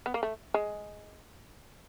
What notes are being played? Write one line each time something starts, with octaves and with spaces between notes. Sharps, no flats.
B3
A#3
A3
G#3